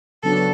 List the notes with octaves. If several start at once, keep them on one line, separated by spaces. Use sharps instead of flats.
C#3 F#3 B3 D4 F#4 A4